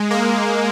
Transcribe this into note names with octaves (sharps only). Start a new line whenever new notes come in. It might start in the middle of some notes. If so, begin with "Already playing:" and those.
Already playing: G#3
A#3